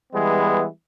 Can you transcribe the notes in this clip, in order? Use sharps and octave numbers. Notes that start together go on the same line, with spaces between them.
E3 G3 G#3 B3